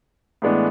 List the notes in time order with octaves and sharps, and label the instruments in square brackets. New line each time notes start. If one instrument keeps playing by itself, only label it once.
[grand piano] A2 E3 G#3 B3 D4